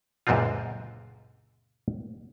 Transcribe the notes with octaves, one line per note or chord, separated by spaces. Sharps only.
C#2 F#2 A#2 D3 C4 F4